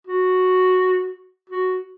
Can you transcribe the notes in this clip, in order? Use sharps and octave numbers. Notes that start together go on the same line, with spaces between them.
F#4
F#4